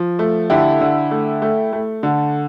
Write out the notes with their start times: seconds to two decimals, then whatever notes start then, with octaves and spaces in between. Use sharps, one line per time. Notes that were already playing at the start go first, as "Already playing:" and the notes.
Already playing: F3
0.19 A3
0.50 D3 E4 G4
0.81 D3
1.11 A3
1.42 A3
1.73 A3
2.03 D3